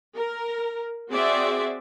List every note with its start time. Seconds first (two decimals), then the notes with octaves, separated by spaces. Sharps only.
0.15 A#4
1.10 C4 F#4 G#4 C5 D5 E5